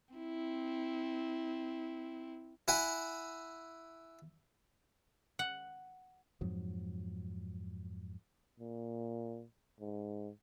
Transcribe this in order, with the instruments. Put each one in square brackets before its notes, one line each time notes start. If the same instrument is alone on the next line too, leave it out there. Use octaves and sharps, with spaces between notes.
[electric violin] C4 E4
[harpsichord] E4 F#5 G#5
[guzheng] F#5
[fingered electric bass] F2 G#2 F3 F#3
[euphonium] A#2
G#2